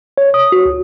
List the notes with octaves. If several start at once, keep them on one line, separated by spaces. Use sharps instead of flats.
C#5
D#6
F#4
C#2